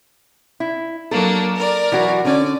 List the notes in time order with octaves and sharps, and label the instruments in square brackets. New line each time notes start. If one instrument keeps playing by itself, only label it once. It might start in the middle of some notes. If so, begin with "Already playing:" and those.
[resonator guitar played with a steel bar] E4
[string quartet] F#3 A#3 D4 [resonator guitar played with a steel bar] A4
[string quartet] A#4 D5
[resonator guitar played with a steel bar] E3 F#3 F#4
[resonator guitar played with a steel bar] D3 C#4 [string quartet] D5